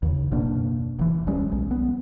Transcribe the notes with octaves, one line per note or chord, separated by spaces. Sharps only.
D#2 C#3
F#1 B2 A#3 D4
F1 E3
D1 G3 G#3 C#4
B1
B3